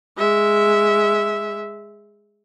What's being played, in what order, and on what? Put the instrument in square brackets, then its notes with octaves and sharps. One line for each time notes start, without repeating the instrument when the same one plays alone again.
[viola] G#3 E5